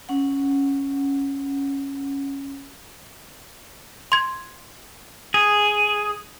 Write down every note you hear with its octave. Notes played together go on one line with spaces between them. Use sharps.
C#4 F#5
C6 G#6
G#4